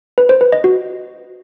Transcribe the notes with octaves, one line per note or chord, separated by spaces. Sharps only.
B4
C5
B4
D#5
F#4